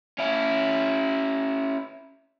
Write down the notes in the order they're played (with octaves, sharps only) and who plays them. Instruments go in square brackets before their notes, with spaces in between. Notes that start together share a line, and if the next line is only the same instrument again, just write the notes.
[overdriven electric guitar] C#4 E4